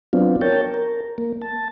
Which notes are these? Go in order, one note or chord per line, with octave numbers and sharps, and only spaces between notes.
F#3 B3 C4 D4 F4
A#4 C#5 G5 A5
A#4
A#3
A5